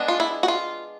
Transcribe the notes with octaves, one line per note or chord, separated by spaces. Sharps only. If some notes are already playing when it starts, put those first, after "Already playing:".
Already playing: G#3 B3 D4
F4
E4
F#4
F4